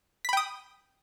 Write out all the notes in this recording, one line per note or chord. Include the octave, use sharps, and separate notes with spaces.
G5 B5 D#6 B6